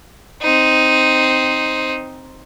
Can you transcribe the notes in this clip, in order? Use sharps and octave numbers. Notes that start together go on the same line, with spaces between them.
C4 D#4